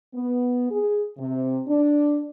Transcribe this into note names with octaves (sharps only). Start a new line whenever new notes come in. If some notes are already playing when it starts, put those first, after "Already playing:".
B3
G#4
C3
D4